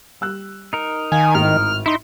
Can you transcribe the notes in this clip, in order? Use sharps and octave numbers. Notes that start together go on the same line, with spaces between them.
G3 E6 F#6
D#4 A#4
D#3 F5 G#5
G#1 A2 F6
D#4 E4 C6